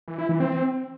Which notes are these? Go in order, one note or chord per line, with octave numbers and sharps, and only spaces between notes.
E3
E4
E3
C4